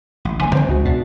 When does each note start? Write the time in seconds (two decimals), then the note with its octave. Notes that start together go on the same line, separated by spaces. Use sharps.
0.25 A1
0.41 D#1 D3 A#3 G#5
0.55 F#1 D#2 C4 C5 G5
0.69 C#2 C#3 D#4 F#4
0.85 E2 B2 D4 E4 F#4